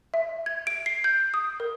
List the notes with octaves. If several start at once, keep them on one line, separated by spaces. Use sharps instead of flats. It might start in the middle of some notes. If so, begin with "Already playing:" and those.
E5
G#6
D7
C7
G6
D#6
A#4